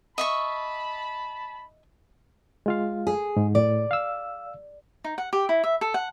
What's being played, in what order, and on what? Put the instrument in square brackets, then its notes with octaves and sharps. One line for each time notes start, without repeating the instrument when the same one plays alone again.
[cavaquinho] D#5 E5 C#6 [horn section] A5 B5
[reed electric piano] G#3 F4 F5
[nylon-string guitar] G#4
[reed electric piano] G#2
[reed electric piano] A2 [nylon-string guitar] D5
[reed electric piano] F5 E6
[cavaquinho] D#4
F#5
G4
E4
E5
A4
F#5